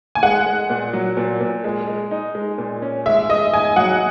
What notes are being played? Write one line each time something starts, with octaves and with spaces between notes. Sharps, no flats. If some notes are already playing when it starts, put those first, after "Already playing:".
G#5
G#3 F#5
G#3
A#2
F#3
A#2
A#2
G#3
G#3
D#4
G#3
A#2
C#4
G#3 E5
G#3 D#5
G#3 G#5
F#3 F#5